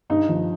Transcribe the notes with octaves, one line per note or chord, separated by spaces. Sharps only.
G2 D#4
F3